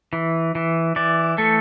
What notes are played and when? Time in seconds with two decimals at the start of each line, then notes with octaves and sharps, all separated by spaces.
0.13 E3
0.55 E3
0.96 E3 D5
1.38 A3 A4